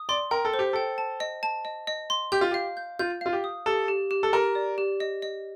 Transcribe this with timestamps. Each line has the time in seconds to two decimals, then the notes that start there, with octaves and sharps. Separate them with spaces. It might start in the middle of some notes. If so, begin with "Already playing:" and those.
Already playing: D#6
0.09 D5 C6
0.31 A#4 G5
0.45 A4
0.54 C5
0.59 G4
0.73 A4 G5
0.98 A5
1.20 D#5
1.43 A5
1.65 D#5
1.87 D#5
2.10 C6
2.32 G4 G6
2.41 F4
2.51 G4 F5
2.77 G6
2.99 F4 G6
3.21 F4 F5
3.33 G4
3.44 D#6
3.66 G4 A4
3.88 G4
4.11 G4
4.23 A4
4.33 G4 A#4
4.55 D5
4.78 G4
5.00 D#5
5.22 D#5